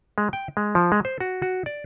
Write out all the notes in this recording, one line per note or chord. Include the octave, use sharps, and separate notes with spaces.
G#3
G5
G#3
F3
G#3
C5
F#4
F#4
D5